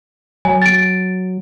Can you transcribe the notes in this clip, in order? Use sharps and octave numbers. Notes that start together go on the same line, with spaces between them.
F#3 G#5
A6 D7